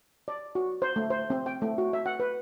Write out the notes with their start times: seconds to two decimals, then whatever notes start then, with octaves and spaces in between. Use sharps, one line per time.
0.28 D5
0.55 F#4
0.82 C5
0.96 A3
1.10 C5
1.30 C4
1.46 G5
1.62 A3
1.78 F#4
1.93 E5
2.06 F#5
2.20 B4